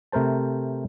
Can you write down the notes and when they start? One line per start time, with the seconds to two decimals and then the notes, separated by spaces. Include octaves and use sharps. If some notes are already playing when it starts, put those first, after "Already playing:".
0.12 C3 A3 A#4 C5 A5